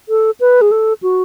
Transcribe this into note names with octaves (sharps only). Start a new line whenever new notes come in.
A4
B4
G#4
A4
F#4